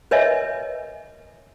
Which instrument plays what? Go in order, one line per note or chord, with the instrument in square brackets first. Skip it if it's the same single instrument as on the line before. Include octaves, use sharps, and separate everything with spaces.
[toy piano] A#4 B4 C#5 D#5 E5 G#5